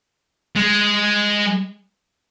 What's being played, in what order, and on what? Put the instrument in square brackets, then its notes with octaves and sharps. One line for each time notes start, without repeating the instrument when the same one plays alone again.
[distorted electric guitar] G#3